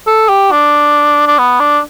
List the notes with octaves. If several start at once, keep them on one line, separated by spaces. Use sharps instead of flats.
A4
G4
D4
D4
B3
D4